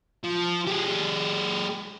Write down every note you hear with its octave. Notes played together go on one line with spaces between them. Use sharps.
F3
G#3 G4